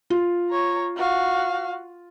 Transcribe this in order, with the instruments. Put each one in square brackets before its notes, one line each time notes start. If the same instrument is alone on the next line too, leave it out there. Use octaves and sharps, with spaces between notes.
[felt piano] F4
[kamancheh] C#5 A#5
F#4 F5